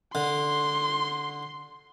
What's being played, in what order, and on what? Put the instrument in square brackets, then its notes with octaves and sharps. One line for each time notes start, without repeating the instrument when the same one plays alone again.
[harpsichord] D3 [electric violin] C6